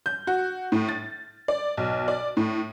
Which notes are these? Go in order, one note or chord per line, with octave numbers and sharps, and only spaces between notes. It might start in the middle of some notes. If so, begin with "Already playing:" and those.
G6
F#4
A2
A6
D5
B1
D5
A2